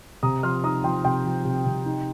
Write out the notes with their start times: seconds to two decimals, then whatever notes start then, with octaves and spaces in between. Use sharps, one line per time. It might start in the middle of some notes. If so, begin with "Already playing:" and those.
0.23 C3 A#5 D#6
0.43 F3 C6 F6
0.64 D#4 A#5 D#6
0.84 F3 G5 C6
1.04 C3 G5 C6
1.25 F3
1.45 C3
1.66 C3
1.86 D#4